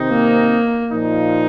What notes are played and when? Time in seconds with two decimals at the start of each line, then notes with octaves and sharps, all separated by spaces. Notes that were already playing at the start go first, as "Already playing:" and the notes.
Already playing: C3 D#3 C4 D#4
0.09 A#3
0.92 A#2 F3 D#4